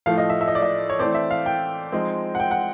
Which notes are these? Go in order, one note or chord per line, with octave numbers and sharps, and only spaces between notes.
A2 F3 A3 F5
D#5
E5
E5
D#5
D5
D#5
C#5
E3 A3 C4 D5
E5
F5
G5
F3 G#3 C4 D#4
F#5
G5
F#5